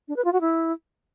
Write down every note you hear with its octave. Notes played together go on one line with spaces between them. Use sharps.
D4
B4
F4
F#4
E4